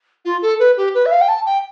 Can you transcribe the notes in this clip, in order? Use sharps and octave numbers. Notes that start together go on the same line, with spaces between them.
F4
A4
B4
G4
B4
E5
F5
G5
A5
G5